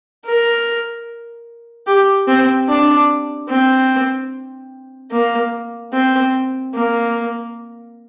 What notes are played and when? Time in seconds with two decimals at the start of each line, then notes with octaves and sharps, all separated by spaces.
0.25 A#4
1.86 G4
2.27 C4
2.68 D4
3.49 C4
5.11 A#3
5.93 C4
6.74 A#3